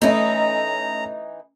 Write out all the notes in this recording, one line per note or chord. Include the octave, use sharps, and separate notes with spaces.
E3 A3 C#4 D#4 D#5 A#5